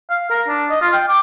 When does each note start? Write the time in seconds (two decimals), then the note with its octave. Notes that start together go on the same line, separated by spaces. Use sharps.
0.09 F5
0.31 A#4
0.47 D4
0.70 D#5
0.81 F4
0.93 G5
1.08 D6